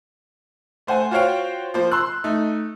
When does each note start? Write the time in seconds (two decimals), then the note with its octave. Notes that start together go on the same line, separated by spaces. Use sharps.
0.87 A3 C5 F#5 G#5
1.11 F4 F#4 C5 C#5 F5 G5
1.74 F3 A#3 C5
1.91 C6 E6 F#6
2.24 A3 D#4